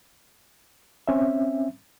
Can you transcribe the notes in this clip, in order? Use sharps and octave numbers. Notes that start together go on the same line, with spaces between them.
C4 C#4 E5